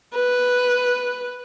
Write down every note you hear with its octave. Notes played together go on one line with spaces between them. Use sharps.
B4